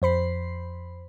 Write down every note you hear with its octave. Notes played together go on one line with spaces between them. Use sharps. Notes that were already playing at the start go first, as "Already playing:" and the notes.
F2 C5 B5 C7